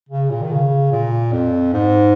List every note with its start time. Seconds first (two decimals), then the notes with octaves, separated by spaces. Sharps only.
0.09 C#3
0.30 A#2
0.42 D#3
0.51 C#3
0.92 A#2
1.32 F2
1.73 G#2